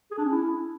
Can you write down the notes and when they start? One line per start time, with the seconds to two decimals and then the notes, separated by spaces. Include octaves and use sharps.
0.11 G#4
0.18 D4
0.24 C#4
0.31 E4